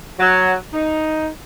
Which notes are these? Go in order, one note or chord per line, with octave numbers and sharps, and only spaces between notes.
F#3
D#4